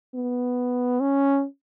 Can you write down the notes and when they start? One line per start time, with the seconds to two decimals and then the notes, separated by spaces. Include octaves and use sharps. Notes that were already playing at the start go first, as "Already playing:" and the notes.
0.15 B3
1.00 C#4